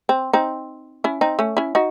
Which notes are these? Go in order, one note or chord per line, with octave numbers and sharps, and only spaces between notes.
C4
C4 D#4
C#4 E4
C4 D#4
A3 C#4
C#4 E4
D#4 F#4